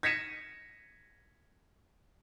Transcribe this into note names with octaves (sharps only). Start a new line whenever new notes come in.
G#6 A#6 B6 C#7 D#7 E7